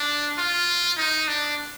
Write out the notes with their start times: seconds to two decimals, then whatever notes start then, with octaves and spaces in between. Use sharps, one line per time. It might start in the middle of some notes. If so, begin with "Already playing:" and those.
Already playing: D4
0.38 F4
0.98 D#4
1.28 D4